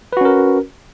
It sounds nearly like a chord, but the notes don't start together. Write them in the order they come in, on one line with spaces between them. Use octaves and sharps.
B4 F#4 C#4 A#4